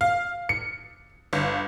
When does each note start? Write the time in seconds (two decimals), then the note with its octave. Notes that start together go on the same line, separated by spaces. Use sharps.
0.01 F5
0.49 C#7
1.33 G1